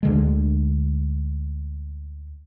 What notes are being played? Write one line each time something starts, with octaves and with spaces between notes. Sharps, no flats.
D2 D3 G#3